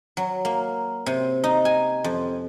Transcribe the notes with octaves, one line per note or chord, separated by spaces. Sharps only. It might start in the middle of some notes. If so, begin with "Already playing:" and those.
F#3
A#3
C3
D#4
G#5
F2